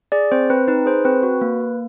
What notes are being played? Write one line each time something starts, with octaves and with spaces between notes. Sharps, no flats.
G#4 D5
C4 C5
C4 B4
D#4 B4
G#4 C5
C4 B4
F#4
A#3
A#3